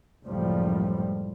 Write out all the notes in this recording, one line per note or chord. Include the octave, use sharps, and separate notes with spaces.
F#1 C#2 A2 F3 G3